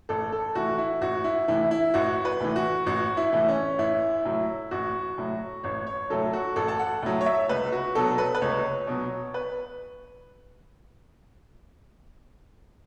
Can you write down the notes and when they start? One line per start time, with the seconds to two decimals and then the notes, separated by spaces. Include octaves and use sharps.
0.09 A1 A4
0.32 A4
0.55 A2 E3 F#4
0.78 E4
1.01 A1 F#4
1.24 E4
1.48 A2 E3 E4
1.71 E4
1.94 A1 F#4
2.25 B4
2.40 A2 E3
2.56 F#4
2.86 A1 F#4
3.17 E4
3.32 A2 E3
3.48 C#4
3.79 A1 E4
4.25 A2 F#3
4.71 A1 F#4
5.18 A2 F#3
5.64 A1 C#5
5.87 C#5
6.10 A2 F#3 A4
6.33 F#4
6.56 A1 A4
6.68 A5
6.79 F#5
7.02 A2 F#3
7.21 C#5
7.26 E5
7.49 C#2 B4
7.72 F#4
7.95 B2 F#3 A4
8.18 B4
8.35 B4
8.42 C#2 C#5
8.87 B2 F#3
9.34 B4